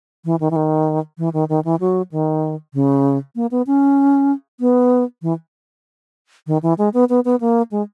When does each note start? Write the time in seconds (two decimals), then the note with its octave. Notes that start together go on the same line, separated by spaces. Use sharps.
0.25 E3
0.40 D#3
0.51 E3
0.56 D#3
1.18 E3
1.33 D#3
1.49 D#3
1.64 E3
1.80 F#3
2.11 D#3
2.74 C#3
3.36 A#3
3.51 B3
3.67 C#4
4.60 B3
5.22 E3
6.47 D#3
6.63 E3
6.78 G#3
6.94 B3
7.09 B3
7.25 B3
7.40 A#3
7.71 G#3